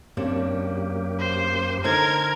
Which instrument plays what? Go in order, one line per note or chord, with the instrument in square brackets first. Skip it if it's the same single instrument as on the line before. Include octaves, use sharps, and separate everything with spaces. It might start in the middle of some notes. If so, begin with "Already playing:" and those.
[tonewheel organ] F#2 A#3 G4 [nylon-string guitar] F#3 C4 D4
[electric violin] C5
[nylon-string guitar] D3 D#4 C5 [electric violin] A#4 G#6